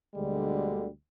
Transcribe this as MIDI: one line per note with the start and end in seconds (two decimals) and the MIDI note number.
0.15 0.88 38
0.15 0.88 47
0.15 0.88 50
0.15 0.88 55
0.15 0.88 56